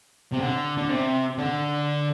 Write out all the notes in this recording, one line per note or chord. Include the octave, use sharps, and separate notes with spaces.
C3
D3
D3
C3
D3